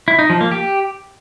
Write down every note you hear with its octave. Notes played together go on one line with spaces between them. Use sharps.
E4
D#4
F3
A#3
G4